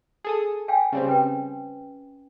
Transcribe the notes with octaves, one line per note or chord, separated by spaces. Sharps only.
G#4 A4 D#6
F5 G5 G#5
C#3 G3 C4
C#4 B4 G5